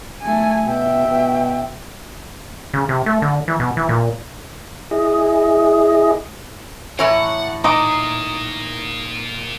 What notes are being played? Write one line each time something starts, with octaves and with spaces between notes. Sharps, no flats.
A3 G#5
B2 E5 G5
B2
C#3
C3
A3
D3
E3
B2
E3
A#2
E4 G#4 D#5
A2 E3 C#5 F#5 A5 A#5
A#2 A#3 D#4 A#5 D6 D#6